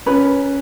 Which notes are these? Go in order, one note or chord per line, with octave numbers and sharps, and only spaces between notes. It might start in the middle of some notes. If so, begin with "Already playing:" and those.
C#4 B4